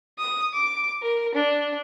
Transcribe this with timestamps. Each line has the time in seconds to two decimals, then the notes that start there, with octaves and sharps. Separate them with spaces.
0.17 D#6
0.53 D6
1.01 A#4
1.35 D4